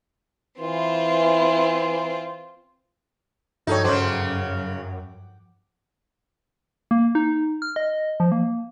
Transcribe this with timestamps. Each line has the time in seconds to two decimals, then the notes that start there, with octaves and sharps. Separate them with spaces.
0.60 E3 C4 F4
3.67 G2 F3 D#4 F#4 A4 C#5 G5
3.85 F#2 C#3 F#3 C5 F#5 G5 D6
6.91 A#3
7.15 D#4
7.62 F6
7.76 D#5
8.20 F3
8.32 A#3